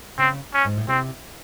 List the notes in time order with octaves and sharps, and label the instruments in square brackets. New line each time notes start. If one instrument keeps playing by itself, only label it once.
[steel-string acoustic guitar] C#3 [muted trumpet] C4
[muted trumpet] C#4
[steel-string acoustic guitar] G#2
A2
[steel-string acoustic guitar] C3 [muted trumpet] C4